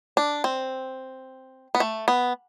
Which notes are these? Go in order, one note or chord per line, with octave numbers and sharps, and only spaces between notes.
D4
C4
B3
A3
B3